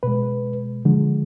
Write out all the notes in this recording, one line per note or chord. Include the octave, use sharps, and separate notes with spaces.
B2 G#3 B4
D3 F3 G#3